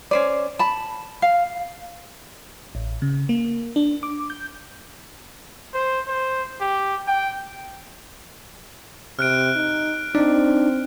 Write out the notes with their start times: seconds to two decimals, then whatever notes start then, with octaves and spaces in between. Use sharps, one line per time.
0.11 C#4 C5 D5
0.59 A5 B5
1.22 F5
2.75 A1
3.02 C#3
3.29 A#3
3.76 D4
4.03 D6
4.30 G6
5.74 C5
6.08 C5
6.61 G4
7.08 G5
9.19 C3 F6 F#6 D7
9.55 D#4
10.15 C4 D4 D#4 D5